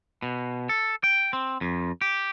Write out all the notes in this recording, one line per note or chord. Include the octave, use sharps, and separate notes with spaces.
B2
A4
G5
C4
F2
G4